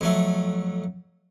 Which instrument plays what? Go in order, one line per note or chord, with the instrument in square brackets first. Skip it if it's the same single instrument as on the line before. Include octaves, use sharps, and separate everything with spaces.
[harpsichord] F2 F#3 A3